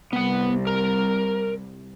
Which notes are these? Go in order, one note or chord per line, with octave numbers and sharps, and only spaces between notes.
C2 B3 F#5
A#4